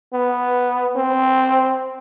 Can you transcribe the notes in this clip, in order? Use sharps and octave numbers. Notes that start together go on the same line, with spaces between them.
B3
C4